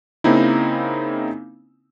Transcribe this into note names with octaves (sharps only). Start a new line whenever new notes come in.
C#3 A#3 C4 D#4 E4